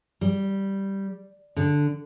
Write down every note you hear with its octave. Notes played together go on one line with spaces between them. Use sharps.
G3
D3